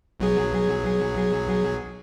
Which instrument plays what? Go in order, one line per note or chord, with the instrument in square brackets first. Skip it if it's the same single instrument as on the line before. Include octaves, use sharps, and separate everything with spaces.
[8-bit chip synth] B1 F#3 G#4